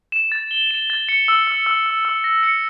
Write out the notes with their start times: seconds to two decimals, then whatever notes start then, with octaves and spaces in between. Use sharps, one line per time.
0.12 E7
0.32 A6
0.51 G7
0.71 E7
0.90 A6
1.09 C#7
1.28 E6
1.47 E6
1.66 E6
1.86 E6
2.05 E6
2.24 A#6
2.43 C#7